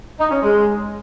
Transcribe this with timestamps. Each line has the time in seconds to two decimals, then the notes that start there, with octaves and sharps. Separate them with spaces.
0.20 D#4
0.31 C#4
0.43 G#3